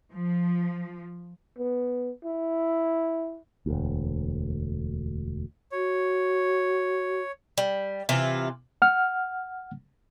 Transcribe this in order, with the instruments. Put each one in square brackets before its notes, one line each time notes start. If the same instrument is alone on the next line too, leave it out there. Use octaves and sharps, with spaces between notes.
[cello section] F3
[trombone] B3
E4
[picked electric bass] E1 D2
[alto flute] F#4 [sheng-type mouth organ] C#5
[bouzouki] G3
C3 E3 F4
[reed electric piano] F#5 F6